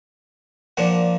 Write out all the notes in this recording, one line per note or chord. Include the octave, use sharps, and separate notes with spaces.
A#2 F3 A#3 D4 F#5